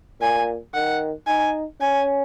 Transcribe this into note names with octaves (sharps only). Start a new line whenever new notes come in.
A#2 G#5
D#3 F#5
D#4 G#5
C#4 G#5